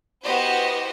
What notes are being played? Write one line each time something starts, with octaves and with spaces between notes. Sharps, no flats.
B3 E4 F#4 G4 C5 D#5